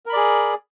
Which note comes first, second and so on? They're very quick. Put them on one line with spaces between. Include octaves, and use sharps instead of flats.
A#4 B5 D5 G#4